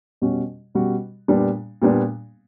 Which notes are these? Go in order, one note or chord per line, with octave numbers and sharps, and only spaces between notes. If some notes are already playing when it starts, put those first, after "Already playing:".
B2 G3 C#4 F#4
B2 G3 C#4 F#4
A#2 G3 B3 D4
A#2 G3 B3 D4